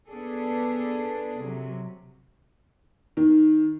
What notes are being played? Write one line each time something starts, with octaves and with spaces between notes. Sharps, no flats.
B3 D4 G#4 A4
C3 F#3
D#3